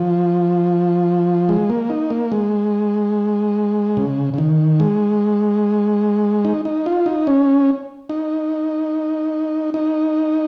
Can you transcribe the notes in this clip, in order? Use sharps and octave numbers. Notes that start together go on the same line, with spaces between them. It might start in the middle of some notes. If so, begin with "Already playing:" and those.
Already playing: F3
G#3
A#3
D#4
A#3
G#3
C#3
C#3
D#3
G#3
D#4
D#4
F4
D#4
C#4
D#4
D#4